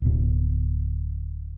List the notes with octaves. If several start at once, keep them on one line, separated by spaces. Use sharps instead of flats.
D1 B2